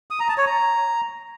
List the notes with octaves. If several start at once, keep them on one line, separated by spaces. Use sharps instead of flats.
D#6
A#5
A5
C#5
A#5